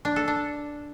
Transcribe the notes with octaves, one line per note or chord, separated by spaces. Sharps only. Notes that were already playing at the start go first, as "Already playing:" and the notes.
D4
A4
D4